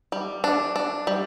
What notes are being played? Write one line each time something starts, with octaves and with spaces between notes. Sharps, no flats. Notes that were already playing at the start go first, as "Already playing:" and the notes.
G3
D4
D4
G3